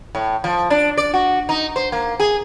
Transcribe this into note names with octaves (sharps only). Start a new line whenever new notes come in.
A2
F3
D4
D5
F#4
D#4
C5
A#3
G#4